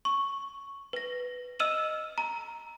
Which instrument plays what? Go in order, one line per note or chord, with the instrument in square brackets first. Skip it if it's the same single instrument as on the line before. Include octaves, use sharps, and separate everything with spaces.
[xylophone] C#6
B4 A#6
D#5 E6 F6 D#7 E7 F#7
A#5